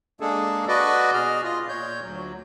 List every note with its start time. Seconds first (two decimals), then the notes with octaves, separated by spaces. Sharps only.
0.20 G#3 A#3 D4 G#4 A4
0.68 F#4 B4 D5 D#5
1.14 B2 G#4 F6
1.44 F4 D#5
1.69 A#2 C#5 G6
2.03 D2 F#3